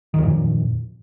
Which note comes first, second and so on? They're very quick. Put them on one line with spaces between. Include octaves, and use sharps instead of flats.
D#3 F2 A#2